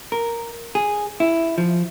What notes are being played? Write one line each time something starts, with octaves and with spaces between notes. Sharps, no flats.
A#4
G#4
E4
F3